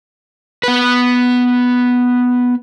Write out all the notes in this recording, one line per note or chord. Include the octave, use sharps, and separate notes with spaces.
B3 B4